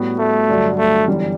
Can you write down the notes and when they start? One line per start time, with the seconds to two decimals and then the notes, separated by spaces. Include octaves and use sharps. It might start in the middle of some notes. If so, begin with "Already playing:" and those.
Already playing: A2 G3 B3 F#4
0.19 A3
0.49 G2 D3 F#3
0.79 A3
1.07 G1 F#2 E3 G3